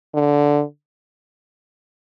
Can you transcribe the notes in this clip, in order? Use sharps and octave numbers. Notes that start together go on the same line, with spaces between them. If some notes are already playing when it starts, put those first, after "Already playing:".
D3